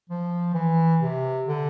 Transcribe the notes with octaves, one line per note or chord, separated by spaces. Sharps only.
F3
E3
C3
D3